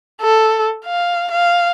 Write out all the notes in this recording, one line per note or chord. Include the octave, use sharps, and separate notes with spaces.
A4
F5
F5